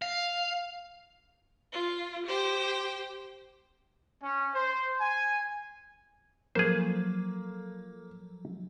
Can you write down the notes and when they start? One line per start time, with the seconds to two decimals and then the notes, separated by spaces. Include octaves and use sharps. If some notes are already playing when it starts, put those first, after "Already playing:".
0.02 F5
1.71 F4
2.26 G4 C5 G5
4.22 C#4
4.54 C5
5.00 G#5
6.55 F3 F#3 A#3 G#4 A4 C5